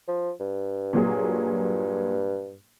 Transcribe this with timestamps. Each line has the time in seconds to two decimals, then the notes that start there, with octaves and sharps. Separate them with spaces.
0.08 F3
0.40 G2
0.93 A#2 F#3 G#4